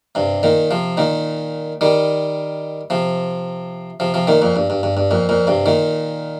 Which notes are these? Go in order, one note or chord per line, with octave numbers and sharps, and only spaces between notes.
G2 C3
A#2 D#3
C3 F3
A#2 D#3
D#3 G3
C3 F3
C3 F3
C3 F3
A#2 D#3
F2 A#2
G2
G2
G2
G2
F2 A#2
F2 A#2
G2 C3
A#2 D#3